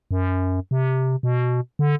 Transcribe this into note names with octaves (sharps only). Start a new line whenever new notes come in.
F#2
C3
B2
D3